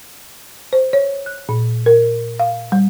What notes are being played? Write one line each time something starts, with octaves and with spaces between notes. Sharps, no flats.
C5
C#5
F#6
A#2
A#4
F5
G3